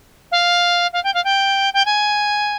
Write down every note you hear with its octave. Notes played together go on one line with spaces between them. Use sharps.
F5
F5
G5
F5
G5
G5
G#5